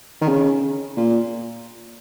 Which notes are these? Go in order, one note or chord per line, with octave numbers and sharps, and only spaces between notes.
D#3
C#3
A#2